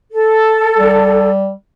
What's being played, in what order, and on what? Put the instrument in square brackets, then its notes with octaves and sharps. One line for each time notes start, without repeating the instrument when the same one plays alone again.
[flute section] A4
[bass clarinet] G3